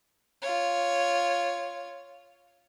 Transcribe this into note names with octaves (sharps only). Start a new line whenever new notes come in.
F4 C#5